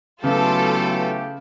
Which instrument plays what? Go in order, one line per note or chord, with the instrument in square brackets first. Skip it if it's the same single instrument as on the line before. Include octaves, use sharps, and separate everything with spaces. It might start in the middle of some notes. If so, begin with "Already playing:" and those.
[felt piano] C#3 [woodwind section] E3 A3 G4 [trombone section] F#3 B3 [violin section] F4 A4